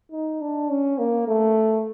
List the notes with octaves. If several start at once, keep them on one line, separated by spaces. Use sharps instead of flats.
D#4
D4
C#4
A#3
A3